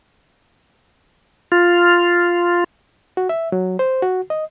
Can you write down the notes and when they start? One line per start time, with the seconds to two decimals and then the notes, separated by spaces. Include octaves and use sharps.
1.52 F4
3.17 F#4
3.29 E5
3.52 F#3
3.79 C5
4.02 F#4
4.30 D#5